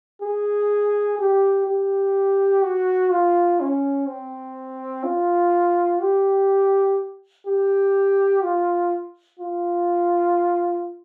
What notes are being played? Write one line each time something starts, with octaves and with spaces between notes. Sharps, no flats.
G#4
G4
G4
F#4
F4
C#4
C4
F4
G4
G4
F4
F4